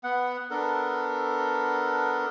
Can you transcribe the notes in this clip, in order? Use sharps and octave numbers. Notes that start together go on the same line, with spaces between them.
B3 F#5
B3 D4 A4 A#4